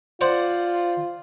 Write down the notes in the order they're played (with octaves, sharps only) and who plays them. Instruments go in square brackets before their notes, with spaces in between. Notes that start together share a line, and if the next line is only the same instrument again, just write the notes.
[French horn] F4 [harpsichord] C5 D5 F#5